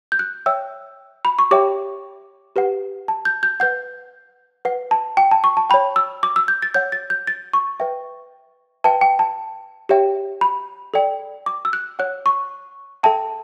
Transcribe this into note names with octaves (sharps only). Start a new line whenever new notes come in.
G6
F#6
C#5 E5 G5 E6
B5
C#6
G4 C#5 E5 G5 D6
G4 B4 F#5
A5
G6
G6
B4 F#5 G6
B4 F#5
A5
G5
A5
C#6
A5
C#5 G5 B5
E6
D6
E6
G6
A6
C#5 F#5 G6
A6
G6
A6
C#6
B4 E5 G5
B4 E5 G5 A5
G5
A5
G4 C#5 E5 G5
B5
A4 D5 G5
D6
E6
F#6
C#5 F#5 F#6
C#6
A4 E5 G5 A5